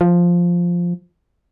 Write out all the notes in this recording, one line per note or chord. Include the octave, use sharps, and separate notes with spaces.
F3